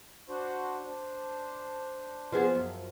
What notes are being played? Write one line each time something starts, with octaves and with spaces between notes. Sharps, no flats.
D4 F#4 C5
D4 C5
F3 B3 G#4
F#2 F3